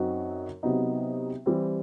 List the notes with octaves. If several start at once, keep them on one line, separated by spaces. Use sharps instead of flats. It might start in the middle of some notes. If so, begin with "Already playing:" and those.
Already playing: F#2 F#3 C4 D#4 F#4
C3 F#3 B3 D#4
E3 G3 C4